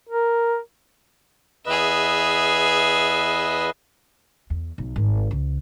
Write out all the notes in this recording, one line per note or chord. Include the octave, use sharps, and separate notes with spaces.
A#4
E2 G#4 B4 D#5 E5
E2
B1
G#1
C#2